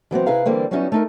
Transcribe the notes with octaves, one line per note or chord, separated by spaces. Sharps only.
E3 F#3 B3 C4
C3 E4 G#4 B4 F5 A#5
D3 E3 G3 A#3 C4
F#3 G3 B3 C#4 D#4 E4
A3 D#4 A#4